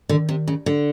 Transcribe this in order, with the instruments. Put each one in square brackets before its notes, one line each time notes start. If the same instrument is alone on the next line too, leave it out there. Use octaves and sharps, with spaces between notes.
[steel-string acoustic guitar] D3 [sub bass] D#3
[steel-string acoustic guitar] C3
C#3
D3